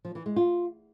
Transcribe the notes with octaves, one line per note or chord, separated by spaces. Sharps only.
F3
E3
G#3
F4